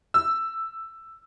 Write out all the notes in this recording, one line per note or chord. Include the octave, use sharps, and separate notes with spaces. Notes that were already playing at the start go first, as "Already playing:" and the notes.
E6